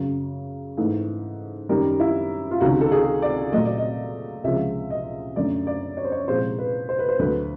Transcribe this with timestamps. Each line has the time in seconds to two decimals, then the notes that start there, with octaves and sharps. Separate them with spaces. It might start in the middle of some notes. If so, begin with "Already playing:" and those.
Already playing: F#2 C#3 F#3
0.77 G#2 E3 A3
1.69 F#2 D#3 G3 A#4
2.00 E4
2.51 F4
2.60 C#2 C3 D#3 F#4
2.81 A4
2.92 G#4
3.22 D5
3.52 A#2 F#3 A3 D#5
3.65 D5
3.78 D#5
4.44 C#2 C3 F3 G#3 E5
4.90 D#5
5.36 F#2 D3 F#3 A3 D5
5.67 D5
5.97 C#5
6.04 C5
6.12 C#5
6.28 C2 A#2 F3 G#3 C5
6.58 B4
6.89 C5
6.99 B4
7.09 C5
7.19 D2 D3 F#3 A3 B4